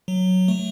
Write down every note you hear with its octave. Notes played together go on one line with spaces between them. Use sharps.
F#3
A3